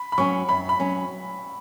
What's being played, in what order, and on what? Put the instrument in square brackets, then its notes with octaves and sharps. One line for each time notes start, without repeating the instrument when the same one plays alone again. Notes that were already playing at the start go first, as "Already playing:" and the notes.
Already playing: [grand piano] B5
B5
[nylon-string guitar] F#3 C#4 [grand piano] C#6
[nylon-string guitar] F#2 [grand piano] B5
[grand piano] B5
[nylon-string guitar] F#3 C#4